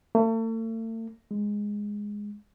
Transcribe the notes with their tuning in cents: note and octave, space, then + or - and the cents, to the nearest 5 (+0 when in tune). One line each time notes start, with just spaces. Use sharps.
A3 +40
G#3 -5